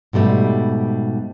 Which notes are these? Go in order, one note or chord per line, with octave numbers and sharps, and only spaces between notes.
G#2 B2 G3 A3